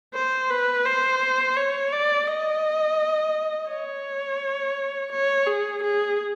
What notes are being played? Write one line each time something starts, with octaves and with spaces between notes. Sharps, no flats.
C5
B4
C5
C#5
D5
D#5
C#5
C#5
G#4
G#4